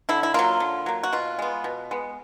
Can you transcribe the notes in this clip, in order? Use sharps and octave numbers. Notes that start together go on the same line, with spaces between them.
D3 E4
E4
F#3 A#3 F4
D3
F#3 A#3
F#4
B2 F4
G#3 B3
B2
G#3 B3